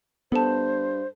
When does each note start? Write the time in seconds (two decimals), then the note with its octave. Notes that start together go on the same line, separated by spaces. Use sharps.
0.32 G2 B3 A4 C5 A5